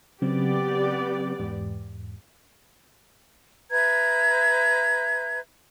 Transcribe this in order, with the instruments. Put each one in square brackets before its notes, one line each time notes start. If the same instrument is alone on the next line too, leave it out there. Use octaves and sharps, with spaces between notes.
[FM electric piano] C#3 F#3 C4 [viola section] B3 G4 D5
[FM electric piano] E2 G#2
[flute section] B4 E5 A#5 G#6